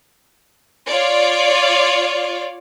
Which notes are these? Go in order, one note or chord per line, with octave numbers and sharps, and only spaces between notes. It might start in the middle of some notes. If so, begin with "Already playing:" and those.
F4 C#5 D5